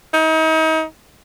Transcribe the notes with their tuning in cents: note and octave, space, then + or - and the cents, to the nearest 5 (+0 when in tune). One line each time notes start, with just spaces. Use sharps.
D#4 +35